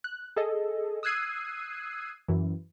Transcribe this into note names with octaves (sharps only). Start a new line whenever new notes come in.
F#6
G#4 A4 D#5
D#6 E6 F#6 G#6 C7 D#7
F#2 E3